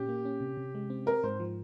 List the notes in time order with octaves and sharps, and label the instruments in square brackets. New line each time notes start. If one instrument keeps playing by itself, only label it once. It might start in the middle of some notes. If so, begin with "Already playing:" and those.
Already playing: [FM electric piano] A#2 C#4 [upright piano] G4
[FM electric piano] A#3
C#4
C3
C3
G#3
C4
[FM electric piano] C4 [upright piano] A#4
[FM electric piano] G#2 [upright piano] C5
[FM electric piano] F3